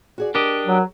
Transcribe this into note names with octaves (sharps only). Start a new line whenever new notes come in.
F#4 G#4 D5
D4 G4 A#4 D#5
F#3